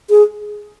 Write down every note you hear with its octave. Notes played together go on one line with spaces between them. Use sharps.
G#4